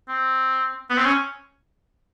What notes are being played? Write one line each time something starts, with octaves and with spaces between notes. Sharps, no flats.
C4
B3
C4
C#4